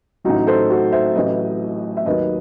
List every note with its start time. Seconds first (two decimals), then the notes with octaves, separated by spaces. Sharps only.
0.24 A1 A2 F#3 D#4 F#4
0.47 A4 C5
0.70 F#4 A4
0.92 C5 E5
1.15 A1 A2 F#3 B4 D#5
1.97 E5
2.06 D#2 D#3 F#3 B4 D#5